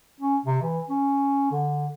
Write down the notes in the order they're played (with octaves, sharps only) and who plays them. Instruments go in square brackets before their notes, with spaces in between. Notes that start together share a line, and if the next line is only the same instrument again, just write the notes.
[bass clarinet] C#4
C3
E3
C#4
D3